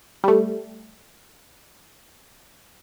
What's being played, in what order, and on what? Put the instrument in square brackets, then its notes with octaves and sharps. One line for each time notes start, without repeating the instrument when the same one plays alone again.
[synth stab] G3 A3